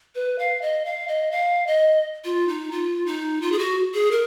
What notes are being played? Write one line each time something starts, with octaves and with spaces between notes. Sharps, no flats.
B4
F5
D#5
F5
D#5
F5
D#5
F4
D#4
F4
D#4
F4
G#4
F#4
G#4
A#4